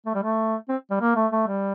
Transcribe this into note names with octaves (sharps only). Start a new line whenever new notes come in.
A3
G3
A3
C4
G3
A#3
A3
A3
G3